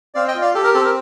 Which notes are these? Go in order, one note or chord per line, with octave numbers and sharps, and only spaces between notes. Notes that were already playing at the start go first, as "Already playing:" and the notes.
C4 D5 F5
D#5 G5
F4
D5 F5
G4 A4
A#4
C4 A4
A#4